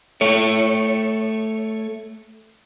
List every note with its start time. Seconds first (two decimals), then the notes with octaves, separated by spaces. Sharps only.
0.21 A3 C#5